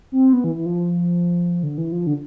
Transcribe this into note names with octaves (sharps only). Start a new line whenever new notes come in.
C4
B3
E3
E3
F3
D3
E3
F3
D3